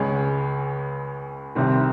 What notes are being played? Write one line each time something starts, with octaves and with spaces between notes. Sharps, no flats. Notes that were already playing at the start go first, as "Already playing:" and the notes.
Already playing: C#2 C#3 G#3
C2 C3 D#3 G3 C4